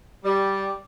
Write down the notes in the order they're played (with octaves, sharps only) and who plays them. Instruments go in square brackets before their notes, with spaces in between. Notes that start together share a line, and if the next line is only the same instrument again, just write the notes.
[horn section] G3 [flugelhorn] D5